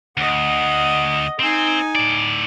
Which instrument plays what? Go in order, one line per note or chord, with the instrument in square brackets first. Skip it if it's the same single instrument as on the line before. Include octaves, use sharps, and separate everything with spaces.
[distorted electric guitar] D2 [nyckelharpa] D#5 F#5
[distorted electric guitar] C4 [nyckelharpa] D#4 G#5
[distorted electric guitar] A2 D5